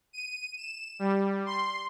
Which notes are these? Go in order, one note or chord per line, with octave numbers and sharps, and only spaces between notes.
D#7
E7
G3
C6